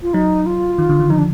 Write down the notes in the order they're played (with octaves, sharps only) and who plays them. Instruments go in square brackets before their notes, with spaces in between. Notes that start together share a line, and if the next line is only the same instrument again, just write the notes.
[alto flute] F4
[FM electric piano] F#3 [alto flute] D#4
[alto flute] F4
[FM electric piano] D#3
D3
D#3
[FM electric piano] F3 [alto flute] D#4
[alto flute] D4